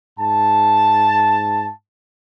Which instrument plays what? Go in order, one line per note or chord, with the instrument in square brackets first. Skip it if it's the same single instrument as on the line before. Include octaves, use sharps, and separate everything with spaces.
[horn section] G#2 A5